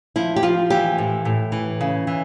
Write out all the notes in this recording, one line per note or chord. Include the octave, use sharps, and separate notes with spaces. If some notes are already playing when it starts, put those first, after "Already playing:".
F3 E4
G4
F3 F4
E3 G4
A2
A2
E3
C#3
E3